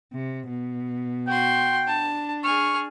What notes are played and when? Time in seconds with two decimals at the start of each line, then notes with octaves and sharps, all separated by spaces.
0.13 C3
0.49 B2
1.28 F#4 G5 C6
1.87 D4 A5
2.44 G#4 C#6 F6